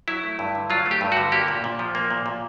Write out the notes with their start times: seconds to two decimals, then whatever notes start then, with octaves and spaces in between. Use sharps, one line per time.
0.08 F#3 E4
0.24 A3
0.39 G2
0.55 D3
0.70 F#3 F4
0.86 A3
0.91 G4
1.01 G2
1.12 F#4
1.17 D3
1.32 A#3 G4
1.48 A#2
1.64 A#2
1.79 F3
1.95 A#3
2.11 A#2
2.26 A#2